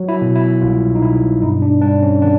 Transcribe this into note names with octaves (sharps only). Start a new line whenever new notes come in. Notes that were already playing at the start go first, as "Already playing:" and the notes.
Already playing: F#3
E4
B2
E4
C2 F4
D#4
B2 E4
G2 D#4
D4
G2 D4
C#4
D#3 D4